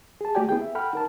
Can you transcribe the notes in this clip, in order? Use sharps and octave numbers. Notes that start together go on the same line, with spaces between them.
G#4 A5
A3 F#4 G4 D5 G5 G#5
B3 E4 G#4 G5
E5
A4 F#5 G5 B5 F6
D#4 A#4 A5